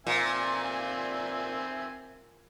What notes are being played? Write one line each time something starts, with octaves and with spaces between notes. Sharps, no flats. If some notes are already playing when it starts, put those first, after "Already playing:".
A#2 C4 E5 G#5